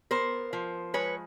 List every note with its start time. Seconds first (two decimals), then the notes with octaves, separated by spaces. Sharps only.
0.11 B3 A#4 C5
0.53 F3
0.94 G#3 B4 C#5